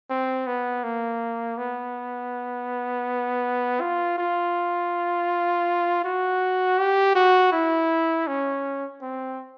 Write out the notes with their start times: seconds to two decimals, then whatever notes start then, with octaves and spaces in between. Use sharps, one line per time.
0.10 C4
0.47 B3
0.83 A#3
1.58 B3
3.81 F4
4.18 F4
6.04 F#4
6.78 G4
7.15 F#4
7.52 E4
8.27 C#4
9.02 C4